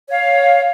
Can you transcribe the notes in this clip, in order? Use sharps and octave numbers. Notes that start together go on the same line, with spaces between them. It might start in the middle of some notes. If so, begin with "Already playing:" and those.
C#5 F5